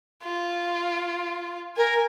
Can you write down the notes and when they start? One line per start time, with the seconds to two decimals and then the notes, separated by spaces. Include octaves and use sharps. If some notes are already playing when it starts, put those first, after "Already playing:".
0.24 F4
1.77 A#4 G#5